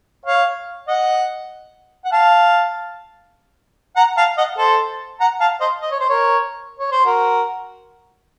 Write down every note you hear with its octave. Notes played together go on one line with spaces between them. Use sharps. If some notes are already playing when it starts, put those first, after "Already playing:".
C#5 F5
D#5 F#5
F#5
F5 A5
F#5 A#5
F5 A5
D#5 F#5
A4 C5
F#5 A#5
F5 A5
C5 D#5
D#5
C#5
C5
A#4 C#5
C#5
C5
F#4 A#4